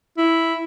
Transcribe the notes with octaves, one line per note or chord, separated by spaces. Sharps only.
E4